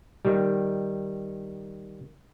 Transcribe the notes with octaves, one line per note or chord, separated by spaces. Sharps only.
D#3 G3